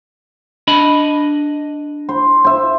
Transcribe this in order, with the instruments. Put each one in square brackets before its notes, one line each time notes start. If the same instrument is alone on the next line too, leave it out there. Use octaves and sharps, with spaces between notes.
[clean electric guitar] D4 D#5 B5
[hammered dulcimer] C5
C5 E5